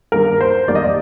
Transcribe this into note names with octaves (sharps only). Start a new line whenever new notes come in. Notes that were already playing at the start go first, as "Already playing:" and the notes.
G2 D#3 A#3 A#4
C5
F2 D#3 G3 A#3 D5
D#5
D5